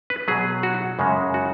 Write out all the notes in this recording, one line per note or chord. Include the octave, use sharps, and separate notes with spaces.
B4
B2 F#3 G#4
F#4
F#2 C#3 G#3
F#4